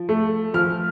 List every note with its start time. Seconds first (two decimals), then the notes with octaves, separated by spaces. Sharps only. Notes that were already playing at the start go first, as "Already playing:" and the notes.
Already playing: F3
0.09 A3
0.54 F3 F6